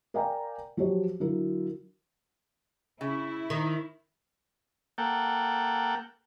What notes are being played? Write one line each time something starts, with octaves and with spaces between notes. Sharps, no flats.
A#4 D5 F5 G5 G#5 A#5
F3 F#3 G4 C#5
D3 F#3 E4 F4 A#4
C#3 E4
D#3
A#3 A4 F#5 G5